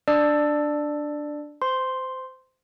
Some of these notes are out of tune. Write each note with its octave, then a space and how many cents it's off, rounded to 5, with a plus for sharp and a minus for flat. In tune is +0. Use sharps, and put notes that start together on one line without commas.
D4 +0 D5 +15 E6 +0
C5 -20 C6 +0